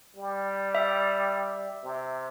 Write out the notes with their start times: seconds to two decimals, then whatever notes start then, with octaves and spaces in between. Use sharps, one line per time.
0.16 G3
0.75 E5
1.84 C3